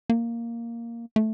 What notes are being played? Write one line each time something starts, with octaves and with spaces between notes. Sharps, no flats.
A#3
A3